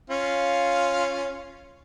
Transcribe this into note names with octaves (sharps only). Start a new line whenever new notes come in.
C#4 F4 F5